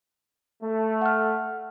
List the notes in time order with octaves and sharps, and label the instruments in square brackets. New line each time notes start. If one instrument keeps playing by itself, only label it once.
[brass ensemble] A3
[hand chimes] F#5 F6